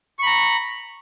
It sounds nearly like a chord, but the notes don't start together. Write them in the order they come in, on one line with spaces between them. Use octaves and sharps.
C#6 B5 A#5